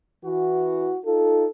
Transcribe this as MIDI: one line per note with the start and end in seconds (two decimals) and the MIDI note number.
0.25 0.96 52
0.25 0.96 66
1.05 1.45 63
1.05 1.45 65
1.05 1.45 69